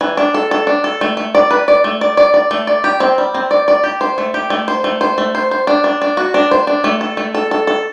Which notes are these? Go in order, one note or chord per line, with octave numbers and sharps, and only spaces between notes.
E3
D4
A4
A4
D4
A4
A3
A3
D5
B4
D5
A3
D5
D5
D5
A3
D5
G4
C4
G3
C4
D5
D5
G4
C5
A3
G4
A3
C5
A3
C5
A3
C5
C5
D4
D4
D4
F#4
D4
C5
D4
A3
A4
A3
A4
A4
A4